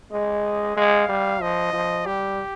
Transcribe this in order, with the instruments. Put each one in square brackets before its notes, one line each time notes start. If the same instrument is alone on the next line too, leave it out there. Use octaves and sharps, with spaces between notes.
[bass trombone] G#3 [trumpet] D#5
[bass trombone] G#3 [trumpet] F5
[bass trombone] G3
[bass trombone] F3 [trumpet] D#5
[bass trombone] F3
[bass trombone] G3 [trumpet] G4